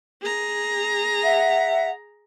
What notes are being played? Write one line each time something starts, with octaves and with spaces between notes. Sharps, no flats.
G#4 A#5
E5 F#5